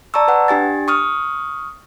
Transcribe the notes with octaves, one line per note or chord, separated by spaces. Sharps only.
D5 A5 A#5 C#6 E6
B4 F#5
D4 G4 G#5 A6
C#6 D#6 F6